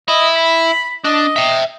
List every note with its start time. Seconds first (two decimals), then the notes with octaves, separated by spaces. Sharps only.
0.08 E4 D#5
0.36 B5
1.04 D4 D#5
1.36 E5 G5